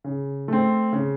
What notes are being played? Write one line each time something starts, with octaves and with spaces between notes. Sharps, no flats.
C#3
A3 C4
C#3